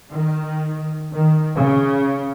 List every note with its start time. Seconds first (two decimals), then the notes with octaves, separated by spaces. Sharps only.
0.12 D#3
1.11 D#3
1.55 C#3